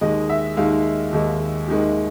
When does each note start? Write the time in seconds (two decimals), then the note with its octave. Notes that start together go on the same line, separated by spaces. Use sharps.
0.01 D#2 D#3 G#3 D#5
0.29 E5
0.57 D#2 D#3 G#3 F5
1.13 D#2 D#3 G#3
1.68 D#2 D#3 G#3